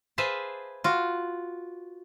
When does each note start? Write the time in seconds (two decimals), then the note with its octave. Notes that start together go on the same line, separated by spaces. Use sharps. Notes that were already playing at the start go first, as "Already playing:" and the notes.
0.18 G#4 B4 C5 E5 F5 A5
0.84 F4 F#4